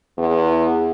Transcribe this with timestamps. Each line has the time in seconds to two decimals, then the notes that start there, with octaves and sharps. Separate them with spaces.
0.18 E2